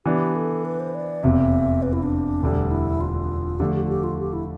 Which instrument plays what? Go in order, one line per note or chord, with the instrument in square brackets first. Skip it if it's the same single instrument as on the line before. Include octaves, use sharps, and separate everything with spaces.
[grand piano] E3 B3 D4 [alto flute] G4
[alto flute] A4
B4
C5
D5
[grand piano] F1 E2 C3 [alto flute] E5
[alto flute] B4
E4
D4
[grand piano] E1 D2 D3 G3
[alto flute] E4
F4
[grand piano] D3 F3 A3 [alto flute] G4
[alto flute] G4
F4
G4
F4
G4
E4